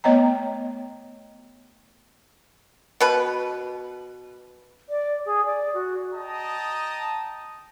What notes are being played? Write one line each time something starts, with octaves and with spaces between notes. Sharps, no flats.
A3 B3 C#5 D#5 G5 A#5
B2 B4
D5
G#4
D5
F#4
D#5 G5 A5 A#5 D#6